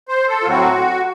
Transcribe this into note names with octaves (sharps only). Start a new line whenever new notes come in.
C5
A4
F4
A2 F#3 C4 F#4